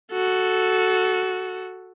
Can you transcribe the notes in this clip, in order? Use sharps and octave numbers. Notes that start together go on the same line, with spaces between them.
F#4 A4